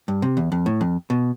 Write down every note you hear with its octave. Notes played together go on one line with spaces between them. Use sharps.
G2
C3
E2
F2
A2
F2
B2